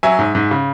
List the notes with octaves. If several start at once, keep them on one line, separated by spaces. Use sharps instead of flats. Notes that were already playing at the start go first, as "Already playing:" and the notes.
F#3 E5 G#5
G#2
G#2
C#3